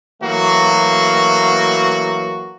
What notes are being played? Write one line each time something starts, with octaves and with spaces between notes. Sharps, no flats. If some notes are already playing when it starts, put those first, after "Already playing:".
E3 F#3 A3 A#3 F#4